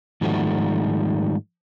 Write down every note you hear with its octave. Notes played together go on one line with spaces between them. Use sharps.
G#2 D#3 F3 G3 A3 F#4